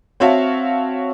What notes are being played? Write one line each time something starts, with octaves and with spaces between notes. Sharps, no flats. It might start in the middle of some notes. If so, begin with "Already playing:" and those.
C4 F#4 C#5 E5 F5 A5